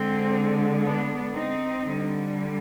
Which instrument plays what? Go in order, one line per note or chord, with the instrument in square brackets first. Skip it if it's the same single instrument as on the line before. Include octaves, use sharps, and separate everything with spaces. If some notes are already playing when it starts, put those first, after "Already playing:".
Already playing: [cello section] D3 G#3 C4
B3 D4
C4 D#4
D3 G3